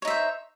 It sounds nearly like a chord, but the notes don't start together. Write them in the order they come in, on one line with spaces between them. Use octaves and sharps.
C#5 D#4 E5 C5